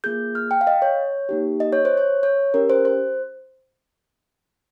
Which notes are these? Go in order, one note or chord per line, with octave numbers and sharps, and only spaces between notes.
A#3 F4 G#4 G6
F6
G5
F5
D#5
C#5
A#3 D#4 G4
D#5
C#5
C5
C#5
C#5
C#4 G4 A#4
C5
C5